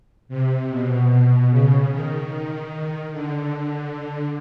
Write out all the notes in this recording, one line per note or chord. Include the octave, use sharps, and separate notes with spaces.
C3
B2
B2
C#3
D#3
D3